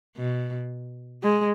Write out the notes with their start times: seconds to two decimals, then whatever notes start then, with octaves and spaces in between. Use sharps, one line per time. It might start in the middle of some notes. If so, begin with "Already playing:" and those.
0.17 B2
1.23 G#3